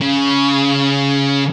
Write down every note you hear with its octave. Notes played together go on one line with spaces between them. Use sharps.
C#3